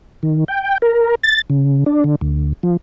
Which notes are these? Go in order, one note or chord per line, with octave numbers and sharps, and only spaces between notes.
D#3
G5
A#4
A6
C#3
D4
D3
D2
F3